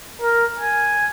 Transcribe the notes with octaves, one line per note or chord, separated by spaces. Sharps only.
A#4
G#5